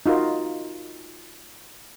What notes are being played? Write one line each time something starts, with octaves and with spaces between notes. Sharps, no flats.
D#4 F4 F#4 A#4